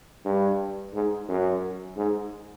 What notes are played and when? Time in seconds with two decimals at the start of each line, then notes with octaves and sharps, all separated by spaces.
0.25 G2
0.94 G#2
1.29 F#2
1.97 G#2